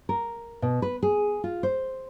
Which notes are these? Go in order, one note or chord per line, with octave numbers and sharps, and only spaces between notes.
A#4
B2
B4
G#4
F4
C5